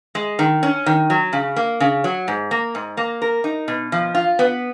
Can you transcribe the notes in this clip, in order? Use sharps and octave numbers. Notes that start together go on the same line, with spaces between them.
G#3
D#3
C#4
D#3
F#3
C#3
A#3
C#3
F#3
G#2
A#3
G#2
A#3
A#4
D#4
B2
F3
F4
B3